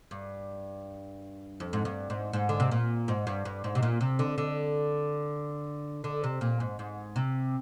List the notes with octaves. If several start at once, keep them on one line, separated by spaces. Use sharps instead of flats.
G2
F2
G#2
G2
G#2
G#2
D3
C3
A#2
G#2
G2
G2
G#2
C3
A#2
C3
D3
D3
D3
C3
A#2
G#2
G#2
C3